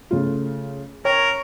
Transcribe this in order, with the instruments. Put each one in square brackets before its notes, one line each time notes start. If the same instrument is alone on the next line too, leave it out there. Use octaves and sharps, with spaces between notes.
[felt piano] C#3 A3 F4
[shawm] A#4 [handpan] C#5 [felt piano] G5